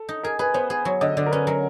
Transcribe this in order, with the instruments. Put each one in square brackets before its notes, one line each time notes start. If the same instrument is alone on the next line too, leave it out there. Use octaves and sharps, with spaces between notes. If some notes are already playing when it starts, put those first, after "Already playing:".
Already playing: [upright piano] A4
[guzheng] D#4
[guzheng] G#4 [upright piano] A#4
[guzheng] G#4 [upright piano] B4
[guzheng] B3 [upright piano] C5
[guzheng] G#4
[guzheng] F#3 [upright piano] C#5
[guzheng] D3 [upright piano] D#5
[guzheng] D3 [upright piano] D5
[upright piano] A#4
[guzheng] C#4 [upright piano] B4
[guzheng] F#3 [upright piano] A#4